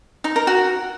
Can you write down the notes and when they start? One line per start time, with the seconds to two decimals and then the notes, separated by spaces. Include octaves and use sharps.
0.24 D#4
0.36 A#4
0.47 F#4